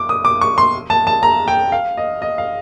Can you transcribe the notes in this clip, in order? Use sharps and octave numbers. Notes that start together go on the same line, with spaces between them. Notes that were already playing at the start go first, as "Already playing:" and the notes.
Already playing: D6
D#6
D6
C#6
C6
A5
A5
A#5
G5
F5
D#5
D#5
F5